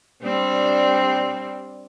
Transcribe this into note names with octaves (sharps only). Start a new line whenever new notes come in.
G3 C4 D4